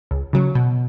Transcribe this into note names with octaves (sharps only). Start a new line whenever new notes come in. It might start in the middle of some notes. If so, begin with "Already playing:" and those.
C#2
C#3 F#3
B2